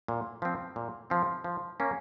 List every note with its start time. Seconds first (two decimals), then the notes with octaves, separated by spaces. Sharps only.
0.08 A#2
0.42 F3 C4
0.76 A#2
1.10 F3 C4
1.44 F3
1.80 A#3 C#4